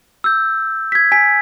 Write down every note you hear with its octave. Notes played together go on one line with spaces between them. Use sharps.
E6 G6
G#6 B6
G#5 B6